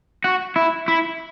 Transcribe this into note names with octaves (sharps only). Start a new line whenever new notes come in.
F#4
E4
E4